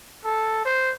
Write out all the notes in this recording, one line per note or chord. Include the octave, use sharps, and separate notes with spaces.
A4
C5